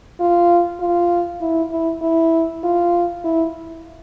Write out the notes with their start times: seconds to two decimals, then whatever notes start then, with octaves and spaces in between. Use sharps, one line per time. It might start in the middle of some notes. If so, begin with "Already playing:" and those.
0.20 F4
0.80 F4
1.41 E4
1.72 E4
2.02 E4
2.64 F4
3.24 E4